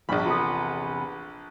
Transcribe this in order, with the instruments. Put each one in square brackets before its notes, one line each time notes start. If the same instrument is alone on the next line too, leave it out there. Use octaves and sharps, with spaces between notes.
[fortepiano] A#1 D4 B5 [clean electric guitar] G2 B2 F3
[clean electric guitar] E2 C3 B3 [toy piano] F4 A4